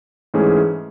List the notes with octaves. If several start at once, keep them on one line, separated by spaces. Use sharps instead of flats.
G#2 E3 A3 C#4 G#4